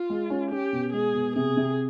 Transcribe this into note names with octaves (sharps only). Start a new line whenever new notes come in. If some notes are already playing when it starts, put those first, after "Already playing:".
Already playing: F4
G#3
C#4
C#4 G4
B2
G#3 G#4
B2
C3 G#4
C3